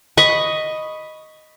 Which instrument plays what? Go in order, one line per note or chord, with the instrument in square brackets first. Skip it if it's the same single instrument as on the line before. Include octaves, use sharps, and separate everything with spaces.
[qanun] D#5 B5 C#6